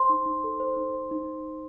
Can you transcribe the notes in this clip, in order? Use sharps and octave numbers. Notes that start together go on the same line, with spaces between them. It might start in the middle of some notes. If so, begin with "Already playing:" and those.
Already playing: C5 C6
D#4
D#4
A4
C5
D#4
C5
D#4